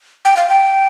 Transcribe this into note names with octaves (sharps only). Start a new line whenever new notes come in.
G5
F5
G5